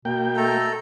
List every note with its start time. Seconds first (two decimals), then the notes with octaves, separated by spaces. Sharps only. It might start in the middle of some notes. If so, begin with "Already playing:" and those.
0.05 B2 A#3 G5
0.37 A3 A4 A#5